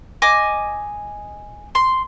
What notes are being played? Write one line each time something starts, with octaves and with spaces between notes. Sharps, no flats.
D#5 G#5 D6
C6